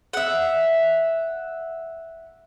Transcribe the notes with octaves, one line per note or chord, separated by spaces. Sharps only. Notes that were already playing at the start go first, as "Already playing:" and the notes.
E5 F#5